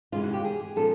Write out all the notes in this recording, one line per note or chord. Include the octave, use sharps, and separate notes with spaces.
C3 E3 G#3 C#4 F4
F#4
G4
G#4
A#2 F3 G#3 C#4 A4